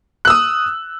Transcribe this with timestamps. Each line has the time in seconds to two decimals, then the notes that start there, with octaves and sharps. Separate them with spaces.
0.25 F#6
0.27 E6
0.30 D#6